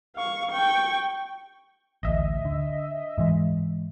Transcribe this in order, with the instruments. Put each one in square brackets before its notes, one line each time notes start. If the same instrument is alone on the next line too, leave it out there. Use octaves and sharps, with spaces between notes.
[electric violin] F5 C#6
G5 C#6
[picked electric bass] A1 D2 [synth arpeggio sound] D#5 E5
[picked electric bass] D3
G#2 E3 G#3